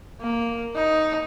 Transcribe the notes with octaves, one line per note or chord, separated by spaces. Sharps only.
A#3
D#4